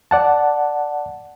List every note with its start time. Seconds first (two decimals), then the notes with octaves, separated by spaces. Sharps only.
0.11 D5 F#5 A5